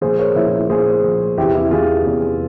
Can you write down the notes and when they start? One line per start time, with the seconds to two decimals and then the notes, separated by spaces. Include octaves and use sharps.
0.01 A#2 F3 G#4 C5
0.18 A#4 C#5
0.36 A#2 F3 E4
0.47 E4
0.69 A#2 F3 G#4 C5
1.03 A#2 F3
1.38 E2 C3 E3 E4 G4
1.55 E4 G4
1.71 E2 C3 E3 F4 G#4
2.06 E2 C3 E3